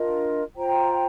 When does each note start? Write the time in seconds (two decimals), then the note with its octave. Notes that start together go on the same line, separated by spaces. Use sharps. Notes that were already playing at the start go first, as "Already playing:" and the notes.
Already playing: D4 F4 A#4 D#5
0.55 F4 C5 G5 A#5